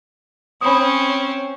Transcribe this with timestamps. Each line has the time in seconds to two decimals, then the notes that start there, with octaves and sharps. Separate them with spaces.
0.61 C4 C#4 B5 D#6